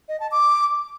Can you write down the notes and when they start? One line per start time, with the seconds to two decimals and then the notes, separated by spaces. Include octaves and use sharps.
0.09 D#5
0.20 A5
0.31 D6